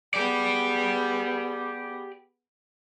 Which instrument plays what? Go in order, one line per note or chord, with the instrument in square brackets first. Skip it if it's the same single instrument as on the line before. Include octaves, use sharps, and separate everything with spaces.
[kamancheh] B3 G#4 [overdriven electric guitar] G4 D5